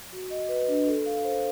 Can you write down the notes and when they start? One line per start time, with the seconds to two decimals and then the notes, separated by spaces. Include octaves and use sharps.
0.12 F#4
0.30 D#5
0.49 B4
0.68 D4
0.87 A4
1.06 F5
1.24 C5